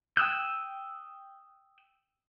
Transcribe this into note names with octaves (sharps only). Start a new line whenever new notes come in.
G5 D#6 E6 F#6 G6